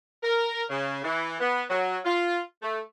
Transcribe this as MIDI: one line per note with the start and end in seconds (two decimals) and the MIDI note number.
0.23 0.63 70
0.69 1.03 49
1.03 1.34 52
1.40 1.62 59
1.69 1.97 54
2.05 2.39 65
2.61 2.79 57